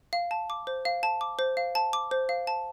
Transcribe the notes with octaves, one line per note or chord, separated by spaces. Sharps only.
F5
A5
D6
C5
F5
A5
D6
C5
F5
A5
D6
C5
F5
A5